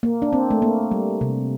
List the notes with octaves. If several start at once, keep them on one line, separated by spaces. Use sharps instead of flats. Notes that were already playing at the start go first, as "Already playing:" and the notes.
A#3
D4
C4
A3
A#3
G3
C3